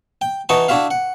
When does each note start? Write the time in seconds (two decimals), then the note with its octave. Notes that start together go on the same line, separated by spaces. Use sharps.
0.21 G5
0.49 E3 D#4 F#4 A5 C#6 D#6
0.68 D4 E4 F#4 E5 F5
0.91 F#5